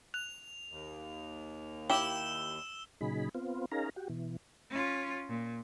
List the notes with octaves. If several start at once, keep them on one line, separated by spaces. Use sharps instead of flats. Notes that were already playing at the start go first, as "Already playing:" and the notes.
F#6 F7
D#2
E4 G4 G5 E6 E7 G7
A#2 C#3 F#3 D#4 G#4 B5
B3 C4 F4
C#4 D#4 G#4 A#4 F5 A#5
F#4 G4
B2 E3
C#4 F4
A#2